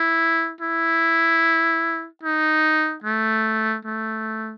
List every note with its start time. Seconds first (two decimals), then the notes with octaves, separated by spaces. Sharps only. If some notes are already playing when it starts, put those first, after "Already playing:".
Already playing: E4
0.61 E4
2.23 D#4
3.04 A3
3.85 A3